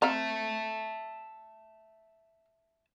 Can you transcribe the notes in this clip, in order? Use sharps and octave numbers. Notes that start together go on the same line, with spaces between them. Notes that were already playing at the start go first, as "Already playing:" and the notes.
C4 E5 F5 A5 A#5